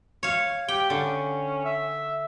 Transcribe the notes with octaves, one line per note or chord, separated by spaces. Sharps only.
C#5 F5
G4 G5
D3 C#4
E5